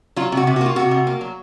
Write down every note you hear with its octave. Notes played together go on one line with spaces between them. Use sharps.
F#3 F4
C3 F#4
C3
F#4
A#3 F4
C3 F#4
C3
A#3
F#3